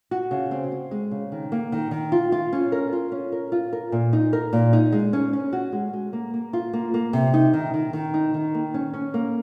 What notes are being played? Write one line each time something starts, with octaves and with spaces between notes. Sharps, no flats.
F#4
C#3
C4
C4
G#3
C#3
D#3
A#3
D#3
D#3
F4
F4
C#4
A#4
F4
C#4
A#4
F4
A#4
A#2
D#4
A#4
A#2
D#4
G#3
C#4
C#4
F#4
G#3
G#3
A#3
A#3
F4
A#3
A#3
C3
D#4
D#3
D#3
D#3
D#4
D#3
A#3
C#4
C#4
A#3